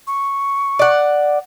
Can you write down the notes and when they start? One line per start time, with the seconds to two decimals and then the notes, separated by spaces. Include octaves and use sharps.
0.07 C#6
0.79 D5 F#5